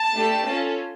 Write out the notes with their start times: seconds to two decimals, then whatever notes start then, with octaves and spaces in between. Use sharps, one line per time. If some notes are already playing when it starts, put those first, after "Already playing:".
Already playing: A5
0.14 A3 D4 G4
0.45 C#4 F4 A4